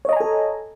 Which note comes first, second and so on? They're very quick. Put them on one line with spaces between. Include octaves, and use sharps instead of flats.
C#5 D#5 A#5 G#5 A4